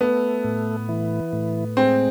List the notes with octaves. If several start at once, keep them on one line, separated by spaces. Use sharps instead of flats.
A3 B3
A2
E3
A2
G#3 C4